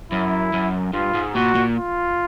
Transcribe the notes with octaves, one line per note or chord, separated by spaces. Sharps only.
F#2 E4
F#2
G2 F4
G#2
A#2 F#4
A#2
F4